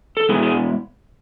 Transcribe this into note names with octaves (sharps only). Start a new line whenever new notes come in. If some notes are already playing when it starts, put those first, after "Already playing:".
A4
B2 G#3 B3 E4 G#4
G#4